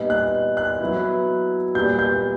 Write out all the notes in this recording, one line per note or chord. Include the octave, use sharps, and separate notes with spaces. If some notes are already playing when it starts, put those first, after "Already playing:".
Already playing: A#2 G3 B3 D#4
F#6
F#6
F#3 B3 E4
A#2 G3 B3 G6
G6